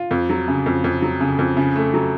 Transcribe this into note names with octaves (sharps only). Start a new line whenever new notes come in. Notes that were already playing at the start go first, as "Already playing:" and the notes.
Already playing: F4
F2
F#3
C#3
F2
F2
F#3
C#3
F2
C#3
A3
F#3